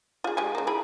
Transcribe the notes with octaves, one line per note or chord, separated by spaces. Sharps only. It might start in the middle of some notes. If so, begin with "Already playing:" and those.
F4 G#4
G#3 G4 G#5
C#3 A#3
E4 G#4 B5